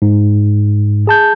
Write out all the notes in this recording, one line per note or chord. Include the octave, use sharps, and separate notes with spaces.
G#2
G#4 A5 G6